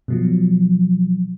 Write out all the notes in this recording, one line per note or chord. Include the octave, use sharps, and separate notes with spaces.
B2 F3 F#3